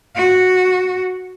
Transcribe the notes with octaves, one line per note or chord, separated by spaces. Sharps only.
F#4